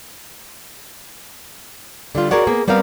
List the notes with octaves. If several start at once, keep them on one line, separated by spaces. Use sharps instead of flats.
D3 G3 F4
F#4 G#4 A#4 C#5 D5 F#5
A#3 B3 G#4
G3 B3 C4 A#4 F5